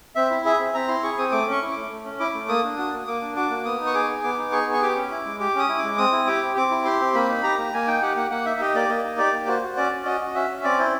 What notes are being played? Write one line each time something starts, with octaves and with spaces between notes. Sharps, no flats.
C4 E5
E4
G#4 E5
C4
C4 A#5
E4 C6
G#4 C#6
C4 D#6
A3 D6
C#4
C#6
E4
A3 D6
A3
C#4
E4 D6
A3
A#3 D#6
D4
F#4 D#6
A#3
A#3 D6
D4
F#4 D6
A#3
B3 D#6
D#4
C#6
G#4 D6
B3
B3 D6
D#4
G#4 C#6
B3
C#6
G4 D6
C#4
E4
G#3
G4 D6
C#4 D#6
E4
G#3 D6
C4 D#6
E4
G4 D6
C4
C4 D6
E4
G4 C6
C4
A#3 B5
D#4
G4 A#5
A#3
A#3 G#5
D#4 G5
G4 F#5
A#3 F#5
A#3 F#5
D#4 E5
G4 D#5
A#3 D5
A#3 D#5
D#4
G4 D5
A#3
F#4 C5
F#4
C#4 D5
C#4
F#4 D#5
F#4
C#4 E5
C#4
C4 D5
E4 C5